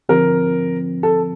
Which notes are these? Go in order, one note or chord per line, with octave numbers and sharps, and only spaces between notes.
D3 F3 C4 A#4
A4